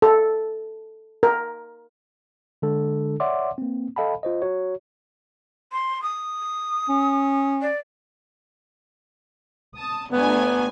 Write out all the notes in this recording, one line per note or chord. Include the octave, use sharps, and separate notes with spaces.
A4
A#4
D3 G#3 D4 A4
C#5 D5 E5 F#5 C6 D6
A#3 C4
A4 D#5 F5 G5 A5 B5
F4 C5 D#5
F#4 C#5
C6
D#6
C#4
D5
A5 D#6
G1 A3 B3 G#5